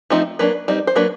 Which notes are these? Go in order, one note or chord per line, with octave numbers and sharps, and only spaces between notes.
F3 A3 C4 D#4
F#3 A#3 D4 B4
G3 C4 D#4
C5
F#3 A#3 D4 B4